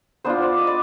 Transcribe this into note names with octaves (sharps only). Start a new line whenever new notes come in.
B3 D4 F4 C5
D5
D#5
D5